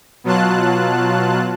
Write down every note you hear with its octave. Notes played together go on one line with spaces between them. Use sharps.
B2 F#3 F4 A5 F#6